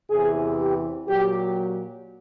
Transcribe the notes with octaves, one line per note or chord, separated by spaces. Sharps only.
E2 C3 E3 G#4
G4
A#2 F#3 G4